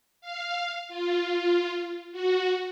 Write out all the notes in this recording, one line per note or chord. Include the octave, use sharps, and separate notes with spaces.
F5
F4
F#4